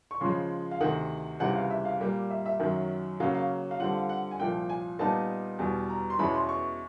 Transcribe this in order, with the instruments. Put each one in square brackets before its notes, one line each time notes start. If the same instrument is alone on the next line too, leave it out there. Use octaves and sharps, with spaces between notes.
[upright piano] C#6
C#3 F3 G#3 C6
F5
D2 C3 D#3 F#5
C#2 C3 E3 G3 F#5
F5
E5
F5
A#2 G3 A#3
E5
E5
F#2 D#3 F#3
C#3 F#3 A#3 C#4 F5
F5
F5
D3 G3 C4 F4 F#5
F5
F#5
G#5
C2 A#2 F3 G5
G#5
A#2 G3 B3 D#4 A5
E2 B2 G3
A#5
C6
E2 B2 G#3 C#4 E4 B5
C6
C#6